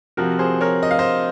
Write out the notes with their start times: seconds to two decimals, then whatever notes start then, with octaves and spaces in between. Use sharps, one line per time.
0.17 C3 F3 C4 F#4 A#4
0.39 G#4 C5
0.61 A#4 C#5
0.83 D#5
0.91 F5
0.99 C5 D#5